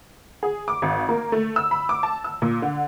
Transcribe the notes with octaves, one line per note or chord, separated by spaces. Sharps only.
G#4
D6
G#1
A#3
A3
E6
B5
D6
A5
E6
A#2
D3